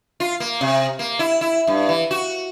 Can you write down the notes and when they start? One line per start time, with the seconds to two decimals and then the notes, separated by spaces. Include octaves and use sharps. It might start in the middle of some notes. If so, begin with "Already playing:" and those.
0.20 F4
0.40 A#3
0.61 C3
0.99 A#3
1.19 E4
1.41 E4
1.67 G2
1.89 E3
2.11 F#4